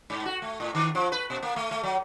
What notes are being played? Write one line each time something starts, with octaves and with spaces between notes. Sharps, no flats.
G#2
F#4
A3
A2
D#3
F3
B4
B2
A#3
A3
A3
F#3